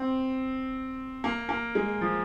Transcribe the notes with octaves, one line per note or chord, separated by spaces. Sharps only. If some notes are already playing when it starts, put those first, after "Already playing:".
Already playing: C4
A#3
A#3
G#3
F3